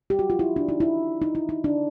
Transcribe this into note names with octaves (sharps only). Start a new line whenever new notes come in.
G4
F#4
F4
E4
D4
D#4
E4
D#4
E4
D#4
D4